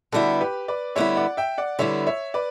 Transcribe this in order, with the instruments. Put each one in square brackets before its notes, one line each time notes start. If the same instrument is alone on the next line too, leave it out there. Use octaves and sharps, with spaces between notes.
[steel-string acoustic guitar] D3 G3 B3 E4 [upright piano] F#4 A4
[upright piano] G4 B4
B4 D5
[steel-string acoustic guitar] D3 G3 B3 E4 [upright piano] C#5 E5
[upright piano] D5 F#5
E5 G5
D5 F#5
[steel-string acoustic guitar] D3 G3 B3 E4 [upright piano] C#5 E5
[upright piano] C#5 E5
B4 D5